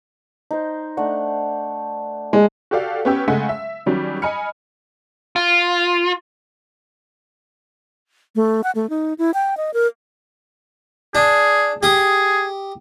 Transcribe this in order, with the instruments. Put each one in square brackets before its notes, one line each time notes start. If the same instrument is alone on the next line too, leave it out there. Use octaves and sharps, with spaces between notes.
[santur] D#4 C5
A3 D4 F#5
[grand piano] G#3
[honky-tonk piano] F#4 G4 A4 D5 F5
B3 C#4 G4 E6
C#3 G#3 A3 F#5 G#5 B6
E5
D#3 F#3 G3 C#4
D#5 G#5 B5 F6 C#7
[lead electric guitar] F4
[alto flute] A3
F#5
A3
D#4
E4
G5
D#5
A#4
[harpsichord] D4 [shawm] G#4
[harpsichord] G4 D#6 [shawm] G#4